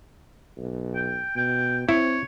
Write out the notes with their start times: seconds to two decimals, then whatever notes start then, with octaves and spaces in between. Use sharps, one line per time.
0.57 B1
0.95 G5
1.36 B2 G5
1.89 C4 E4 C#5